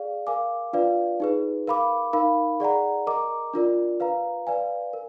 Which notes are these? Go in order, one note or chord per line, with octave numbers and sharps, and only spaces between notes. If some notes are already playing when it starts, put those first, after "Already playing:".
Already playing: G#4 D5 F5
A#4 F5 G#5 D6
D4 F4 B4 D5 F5
D#4 G#4 B4
A#4 F5 B5 D6
D#4 A#4 F5 B5
G#4 D5 F#5 A#5
A#4 D#5 A#5 D6
D4 F4 A#4 D5
B4 F5 A#5
B4 D5 F5 G#5
A#4